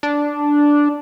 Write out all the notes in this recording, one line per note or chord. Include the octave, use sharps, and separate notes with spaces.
D4